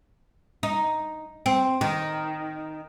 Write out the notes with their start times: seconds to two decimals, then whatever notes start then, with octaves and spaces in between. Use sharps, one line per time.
0.63 D#4
1.46 C4
1.81 D#3